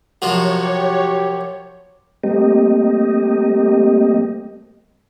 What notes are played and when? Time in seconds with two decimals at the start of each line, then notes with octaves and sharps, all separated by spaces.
0.22 F#2 C3 F3 F#4 C#5
0.63 G4
2.24 G3 A3 A#3 C4 G4 D#5